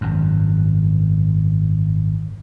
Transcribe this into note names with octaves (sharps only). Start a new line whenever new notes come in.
G#1 F#2